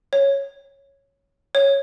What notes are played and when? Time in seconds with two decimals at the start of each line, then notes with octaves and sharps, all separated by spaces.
0.13 C#5
1.55 C#5